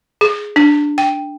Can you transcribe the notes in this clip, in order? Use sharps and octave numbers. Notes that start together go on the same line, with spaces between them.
G#4
D4
G5